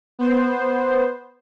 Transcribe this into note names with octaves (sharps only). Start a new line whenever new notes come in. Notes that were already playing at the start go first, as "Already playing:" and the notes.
B3 C5